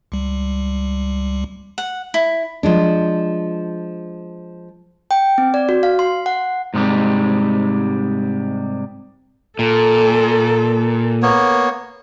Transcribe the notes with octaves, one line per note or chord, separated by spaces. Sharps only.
C#2 G3
F#5
E4
F3 G#3 D4
G5
C4
D5
F#4
F5
C6
F#5
G#2 C3 F3 G3 G#3
A#2 A4
A#3 B3 C#5